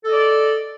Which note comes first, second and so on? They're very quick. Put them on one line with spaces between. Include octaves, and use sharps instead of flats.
A4 D#5 D5